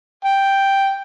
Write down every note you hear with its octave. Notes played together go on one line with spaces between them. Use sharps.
G5